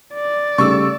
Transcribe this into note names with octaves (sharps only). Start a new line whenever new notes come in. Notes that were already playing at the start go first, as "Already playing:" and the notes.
D5
C#3 G3 A3 C#6 E6